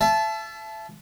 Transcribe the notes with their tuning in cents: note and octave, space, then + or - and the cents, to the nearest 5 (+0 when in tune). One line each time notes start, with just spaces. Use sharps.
E5 +30 A5 -20